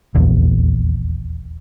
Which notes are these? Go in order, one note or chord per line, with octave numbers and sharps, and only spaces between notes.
D#1 A#1 E2